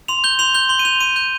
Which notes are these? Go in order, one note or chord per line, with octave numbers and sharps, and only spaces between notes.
C6 F7
G6 G7
C6 F7
G6 G7
C6 G7
D#7
G6 F7
C6 D#7
G6